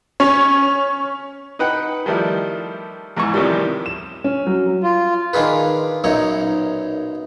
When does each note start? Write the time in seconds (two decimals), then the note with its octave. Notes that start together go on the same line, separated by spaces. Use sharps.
0.20 C#4 C#5
1.59 D#4 B4 F#5 G5
2.06 D#3 F3 G3 A3 E4
3.17 E2 G#2 E3 C#6
3.34 A2 C3 D#3 F3 G3
3.86 E7
4.24 C#4
4.47 F#3
4.83 F4
5.33 D#3 D4 F4 G#4 B4
6.04 B1 F#2 A#2 D#4 C#5